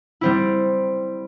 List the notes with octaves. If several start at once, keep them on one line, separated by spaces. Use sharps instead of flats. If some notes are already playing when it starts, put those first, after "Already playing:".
G3 C4 E4